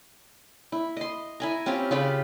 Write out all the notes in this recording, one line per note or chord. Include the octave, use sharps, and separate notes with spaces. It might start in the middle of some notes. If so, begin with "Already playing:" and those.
E4
D#5 C6
E4 G#5 A#5
C4 C#4 F4 G4
C#3 F4 G4 B5